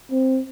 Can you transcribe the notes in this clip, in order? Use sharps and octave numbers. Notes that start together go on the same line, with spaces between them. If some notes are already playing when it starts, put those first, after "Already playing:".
C4